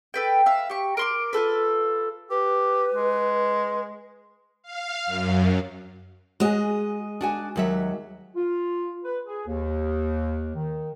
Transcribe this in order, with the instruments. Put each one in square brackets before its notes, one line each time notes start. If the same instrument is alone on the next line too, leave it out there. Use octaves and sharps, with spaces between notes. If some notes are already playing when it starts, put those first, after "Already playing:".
[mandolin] A4 B4 G5
E5 F5
G4 C#6
A#4 C6 D6
F4 F#4 A4 B4
[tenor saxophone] G4 [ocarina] B4
[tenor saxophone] G#3
[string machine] F5
F#2
[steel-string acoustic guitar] G#3 D#5 [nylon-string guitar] F#4 G#4
[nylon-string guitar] D4 F#4 G#5
D#2 F#3 E5
[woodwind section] F4
B4
G#4
D#2
D#3